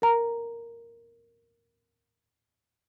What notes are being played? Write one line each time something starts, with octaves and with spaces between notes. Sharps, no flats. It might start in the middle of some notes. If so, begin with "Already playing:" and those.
A#4 A#5